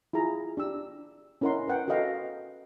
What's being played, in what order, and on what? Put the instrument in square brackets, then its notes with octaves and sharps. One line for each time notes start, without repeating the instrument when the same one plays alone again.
[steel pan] E4 F4 G#4 A#5
D4 G4 E6
C#4 E4 A#4 D#5 F#5 C6
A#4 B4 F#5 G5
F#4 A4 B4 D#5 F5 G5